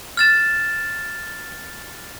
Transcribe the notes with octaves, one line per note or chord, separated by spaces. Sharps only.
F6 A6 E7